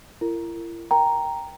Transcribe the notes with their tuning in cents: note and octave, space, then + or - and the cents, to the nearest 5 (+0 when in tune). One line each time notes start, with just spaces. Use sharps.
E4 +45 A#4 -30
A#4 +15 G5 +0 A#5 +0